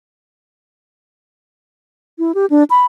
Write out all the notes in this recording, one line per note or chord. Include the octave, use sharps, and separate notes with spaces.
E4
G4
D4
B5